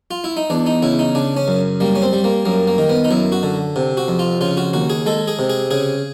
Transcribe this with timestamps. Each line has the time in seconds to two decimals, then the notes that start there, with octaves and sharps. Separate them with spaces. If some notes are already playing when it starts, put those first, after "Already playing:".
0.11 F4
0.24 E4
0.37 D#4
0.50 E2 D4
0.66 D#4
0.82 C#3 E4
0.99 D#4
1.15 C#3 D4
1.37 C#4
1.48 F#2
1.80 G3 A#3
1.95 C#4
2.02 C4
2.13 G3
2.24 A#3
2.45 F#2 A#3
2.67 A#3
2.78 D#3
2.89 B3
3.04 D#4
3.10 F#2 E4
3.32 F#4
3.43 D3
3.76 C3
3.97 F#4
4.08 F2
4.19 F4
4.41 C#3 F4
4.57 F#4
4.73 D#2 F#4
4.90 G#4
5.06 G#3 A4
5.28 G#4
5.39 C3
5.50 G#4
5.71 C#3 G#4